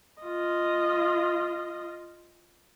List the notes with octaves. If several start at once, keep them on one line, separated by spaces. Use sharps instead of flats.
F4 D#5